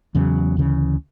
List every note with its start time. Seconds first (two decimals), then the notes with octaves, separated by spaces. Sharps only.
0.15 E2 C#3 F#3
0.57 D2 C#3 E3